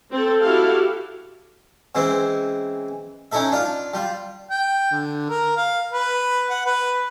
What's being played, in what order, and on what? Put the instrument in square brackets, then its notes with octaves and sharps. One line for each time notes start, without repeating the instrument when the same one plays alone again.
[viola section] C4 A4
E4 F#4 G4 A4 F5
[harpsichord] C#3 E3 G#3 C4 E4
C#4 D#4 E4 A4 E5
D4 F4 F5
G3 F4
[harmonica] G5
D3
A#4
F5
B4
F#5
B4